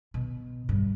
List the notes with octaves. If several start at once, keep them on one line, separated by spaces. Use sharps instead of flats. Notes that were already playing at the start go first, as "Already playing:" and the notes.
B2
G2